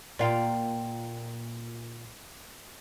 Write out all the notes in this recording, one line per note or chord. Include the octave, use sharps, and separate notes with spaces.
A#2 F4 D5 F5 G5